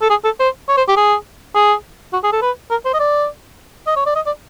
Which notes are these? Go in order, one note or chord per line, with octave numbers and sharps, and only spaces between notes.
A4
G#4
A4
C5
C#5
C5
G4
G#4
G#4
F#4
G#4
A4
B4
A#4
C5
D#5
D5
D#5
C#5
D5
D#5
D5